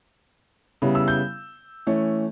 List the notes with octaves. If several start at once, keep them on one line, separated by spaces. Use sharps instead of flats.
C#3 G3 B3 E4
E6
G6
E3 A3 C#4